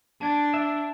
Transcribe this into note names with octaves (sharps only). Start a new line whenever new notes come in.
D4 A5 G#6 A6
E5